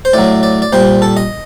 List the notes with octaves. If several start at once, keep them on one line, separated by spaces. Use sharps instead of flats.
C5
A2 F#3 D5
D5
D5
A#2 G3 C5
A4
D#5